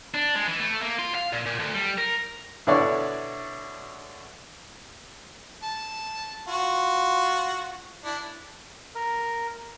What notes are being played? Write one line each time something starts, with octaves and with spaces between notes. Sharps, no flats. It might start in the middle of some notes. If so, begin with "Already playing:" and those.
D4
G#3
E3
A3
A#3
F4
F5
A#2
A#2
D2
G3
A#4
B2 D3 E4 C#5 D5 C#6
A5
F4 F#4
D4 E4
A#4